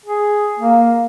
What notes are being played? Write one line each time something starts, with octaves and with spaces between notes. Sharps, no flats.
G#4
A#3